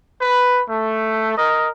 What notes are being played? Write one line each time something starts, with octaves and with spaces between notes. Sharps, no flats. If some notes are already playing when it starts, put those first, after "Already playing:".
B4
A3
A#4 D#5